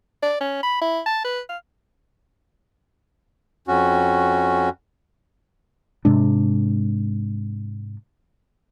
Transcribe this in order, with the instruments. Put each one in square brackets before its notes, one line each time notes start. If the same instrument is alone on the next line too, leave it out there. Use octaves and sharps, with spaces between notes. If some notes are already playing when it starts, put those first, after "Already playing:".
[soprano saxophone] D5
C#4
B5
E4
A5
B4
F5
[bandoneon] F2 C#4 F#4
[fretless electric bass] G#2 C3 G#3 D4